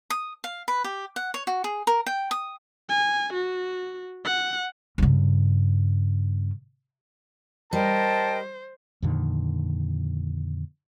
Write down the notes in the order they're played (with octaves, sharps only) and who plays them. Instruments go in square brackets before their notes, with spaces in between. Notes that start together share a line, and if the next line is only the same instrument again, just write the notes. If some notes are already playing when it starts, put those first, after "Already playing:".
[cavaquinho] D#6
F5
B4
G4
F#5
C#5
F#4
G#4
A#4
G5
D#6
[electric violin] G#5
F#4
F#5
[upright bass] G2 C#3
[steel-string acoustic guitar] G3 [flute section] A#4 D#5 G5 [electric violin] C5 [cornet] A5
[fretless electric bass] F2 A#2 D3 D#3